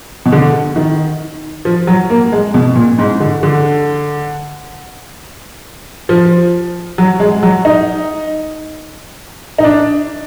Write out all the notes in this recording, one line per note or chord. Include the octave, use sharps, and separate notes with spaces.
B2
D3
D#3
F3
F#3
A#3
G#3
B2
A#2
G#2
D3
D3
F3
F#3
G#3
F#3
D#4
D#4
D4